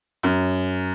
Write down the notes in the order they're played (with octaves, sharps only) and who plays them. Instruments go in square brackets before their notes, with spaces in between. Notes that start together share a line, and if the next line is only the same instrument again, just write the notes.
[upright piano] F#2